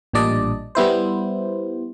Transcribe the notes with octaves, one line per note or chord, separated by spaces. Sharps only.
A1 A#2 G3 D4 D5 D#5
G3 B3 E4 C5